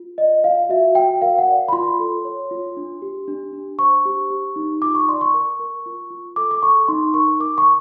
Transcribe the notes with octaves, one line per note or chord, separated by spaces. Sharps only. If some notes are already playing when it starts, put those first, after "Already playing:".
Already playing: F4
D5 D#5
F4 F5
F#4 E5
F#4 G5
A#4 F5
F#5
D5
B5
F4 C6
A4
C#5
F4
D4
G4
D4
D4
C5 C#6
G4
G4
D#4
F4 D6
C#6
D5 C6
C#6
A#4
A#4
F4
F4
A4 D6
D6
A4 C#6
D#4 C6
A#4 C#6
A#4 D6
C#6